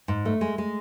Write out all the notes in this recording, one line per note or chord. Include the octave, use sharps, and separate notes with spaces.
G#2
A3
G#3
G#3